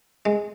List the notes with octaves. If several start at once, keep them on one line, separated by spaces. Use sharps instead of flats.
G#3